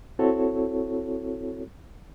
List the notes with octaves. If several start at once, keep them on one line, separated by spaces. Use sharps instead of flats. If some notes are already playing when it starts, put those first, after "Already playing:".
C4 E4 F#4 A4 C#5